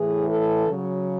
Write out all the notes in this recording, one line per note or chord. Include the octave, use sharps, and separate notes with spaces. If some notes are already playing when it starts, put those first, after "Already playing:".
Already playing: A2 E3 G#4
A4
C#3 F#3